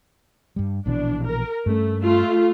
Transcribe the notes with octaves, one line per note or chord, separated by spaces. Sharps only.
G2 G3
A#1 B2 E3 D4
A#4
G2 A3 C#4
A3 F4